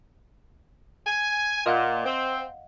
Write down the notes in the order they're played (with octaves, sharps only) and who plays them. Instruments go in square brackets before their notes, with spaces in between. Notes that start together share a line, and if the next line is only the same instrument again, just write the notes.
[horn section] G#5
[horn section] A#2 [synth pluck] D#5 F5 F#5
[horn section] C4